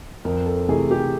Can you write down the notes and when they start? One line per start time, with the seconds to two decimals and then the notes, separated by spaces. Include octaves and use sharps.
0.25 F2 A#4
0.46 A4
0.69 C3 E3 A3 G#4
0.91 G4